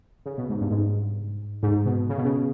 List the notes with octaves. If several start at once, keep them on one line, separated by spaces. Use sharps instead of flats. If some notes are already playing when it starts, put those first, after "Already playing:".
C#3
B2
G#2
G2
G#2
G#2
B2
C#3
B2
C#3